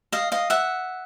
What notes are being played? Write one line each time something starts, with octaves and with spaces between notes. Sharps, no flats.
D#5 F5
D#5 F5
E5 F#5